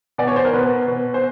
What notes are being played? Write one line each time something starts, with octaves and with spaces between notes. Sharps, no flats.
B2 D5
C#5
C5
A#4
B2 B4
B2
C5